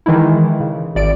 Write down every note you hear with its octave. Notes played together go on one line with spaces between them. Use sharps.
D#3 E3 G#3 D#4 E4
C#3
G#1 D5 D7